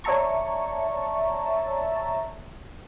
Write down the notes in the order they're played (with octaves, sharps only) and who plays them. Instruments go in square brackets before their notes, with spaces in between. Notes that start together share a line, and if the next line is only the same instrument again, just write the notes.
[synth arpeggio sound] C#5 D5 E5 A5 A#5 C#6